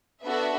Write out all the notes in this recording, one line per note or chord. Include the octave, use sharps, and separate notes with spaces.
B3 D4 F#4 A4 E5